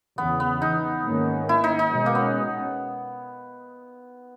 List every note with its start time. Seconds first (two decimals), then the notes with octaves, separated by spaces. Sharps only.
0.18 E2 C#3 E3 B3
0.40 B3
0.62 D#4
1.05 G#2 D#3 A#3 C#4
1.49 E4
1.64 D#4
1.79 D#4
1.93 B2 G#3 C#4
2.06 A#3
2.15 B3